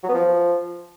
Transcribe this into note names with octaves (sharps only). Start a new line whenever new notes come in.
F#3
B3
F3